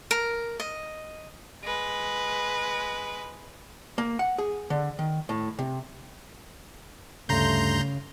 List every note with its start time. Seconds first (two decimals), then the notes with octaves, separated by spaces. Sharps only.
0.11 A#4
0.60 D#5
1.63 G#3 B4
3.98 A#3
4.19 F#5
4.38 G#4
4.70 D3
4.99 D#3
5.29 A2
5.59 C3
7.29 D2 G2 C#3 A3 A#5 C6 G6